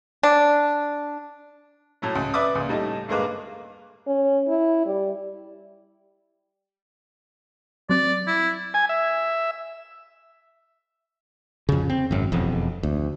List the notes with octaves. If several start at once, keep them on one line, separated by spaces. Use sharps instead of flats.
D4
A2 F#3 A3
C#2
B4 D5 E5 D6 D#6
C#2 A#2
A2 G3 A3 D#4
D2 G2 G#3 A#3 B4 D6
C#4
E4
G3
F#3 C4 D5
E4
G#5
E5
F2 C#3
C4
G#1 F#2
E1 F2
D2